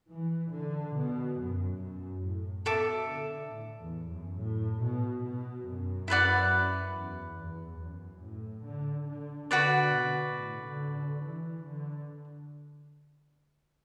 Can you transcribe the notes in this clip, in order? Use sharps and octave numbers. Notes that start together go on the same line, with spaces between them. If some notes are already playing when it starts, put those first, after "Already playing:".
E3
D3
B2
F#2
F#2
A2
B2 A4 E5 D6
D3
A2
E2
F#2
A2
B2
B2
F#2
E4 B4 D5 F#5
E2
E2
F#2
A2
D3
D3
D3 F#4 B4 D5
B2
A2
D3
D3
E3
D3